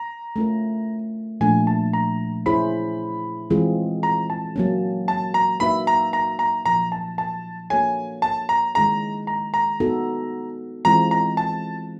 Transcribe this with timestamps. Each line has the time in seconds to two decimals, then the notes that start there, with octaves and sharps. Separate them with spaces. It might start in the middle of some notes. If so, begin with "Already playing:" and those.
Already playing: A#5
0.36 A3 C#4 F4 A#4
1.41 A#2 F3 A3 D4 G#5
1.67 A5
1.93 A#5
2.46 C#4 E4 G#4 C5 B5
3.50 E3 G#3 C4 F4 G#4
4.03 A#5
4.30 A5
4.56 F#3 A#3 C#4
5.08 A5
5.34 A#5
5.60 A#3 D#4 F#4 B4 E5 B5
5.87 A#5
6.13 A#5
6.39 A#5
6.65 A#2 F3 A#3 A#5
6.92 A5
7.18 A5
7.70 A#3 D4 F#4 A4 C#5 G#5
8.22 A5
8.49 A#5
8.75 D#3 G#3 C#4 E4 G#4 A#5
9.27 A#5
9.54 A#5
9.80 B3 D#4 F#4 A4
10.85 E3 G#3 C4 F4 A#5
11.11 A#5
11.37 A5